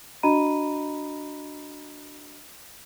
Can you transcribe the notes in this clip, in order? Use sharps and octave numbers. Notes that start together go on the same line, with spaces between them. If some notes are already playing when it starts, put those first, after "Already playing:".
D4 F#4 D#5 A#5 B5 D#7